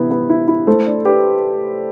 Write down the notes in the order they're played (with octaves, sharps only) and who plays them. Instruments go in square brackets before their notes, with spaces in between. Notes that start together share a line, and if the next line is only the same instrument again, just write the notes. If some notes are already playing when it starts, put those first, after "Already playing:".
Already playing: [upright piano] C3 E3 B3 E4
B3
E4
E4
[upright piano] A3 [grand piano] A4 C5
[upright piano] D4
[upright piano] D4 [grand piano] G4 B4